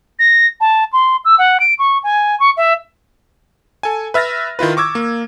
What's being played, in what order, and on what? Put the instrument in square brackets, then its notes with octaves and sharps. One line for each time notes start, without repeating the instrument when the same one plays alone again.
[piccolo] A#6
A5
C6
E6
F#5
D7
C#6
G#5
C#6
E5
[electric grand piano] A4 G#5
B4 E5 F6 A6 A#6
D#3 E4 F4 B4
C#6 D6 E6 G#6
A#3